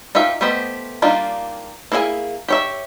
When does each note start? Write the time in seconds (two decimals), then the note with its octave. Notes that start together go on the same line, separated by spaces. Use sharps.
0.15 D#4 F4 G4 E5
0.41 A3 B3 G4 C5 D#5
1.02 G3 A#3 D4 D#4 F4
1.92 A#3 E4 G#4 D#5 G#5
2.48 G4 C#5 E5